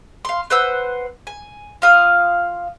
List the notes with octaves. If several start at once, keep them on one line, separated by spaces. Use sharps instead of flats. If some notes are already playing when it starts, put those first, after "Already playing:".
F5 C6
B4 C5 F#5 E6
G#5
F4 F5 D#6